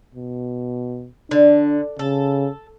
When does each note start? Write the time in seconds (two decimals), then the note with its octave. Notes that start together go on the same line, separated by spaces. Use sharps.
0.15 B2
1.31 D3 D4
1.99 C#3 A4